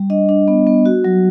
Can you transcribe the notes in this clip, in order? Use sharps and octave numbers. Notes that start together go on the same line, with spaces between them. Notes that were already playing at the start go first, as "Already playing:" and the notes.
Already playing: G3
D4 D#5
D4
B3
B3
F#4
F#3